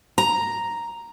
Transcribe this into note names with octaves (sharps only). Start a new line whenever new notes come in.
A#5